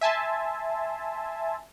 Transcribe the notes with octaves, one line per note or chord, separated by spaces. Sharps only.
E5 G#5 A5 C6